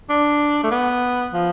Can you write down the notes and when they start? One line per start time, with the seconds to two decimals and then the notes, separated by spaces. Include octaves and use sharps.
0.10 D4
0.64 A3
0.71 B3
1.33 F3